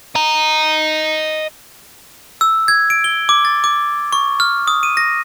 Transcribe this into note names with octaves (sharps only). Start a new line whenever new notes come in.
D#5 A#5
E6
G#6
D7
G7
D6
A6
D6
C#6
F6
D#6
D#7
A#6